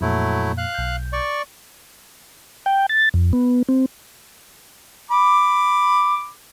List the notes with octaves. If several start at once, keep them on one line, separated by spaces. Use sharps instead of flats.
F2 A#2 F#3 A3 E4
F5 F#6
B1 G6
D5 C#6
G5
A6
F2
B3
C4
B5 D6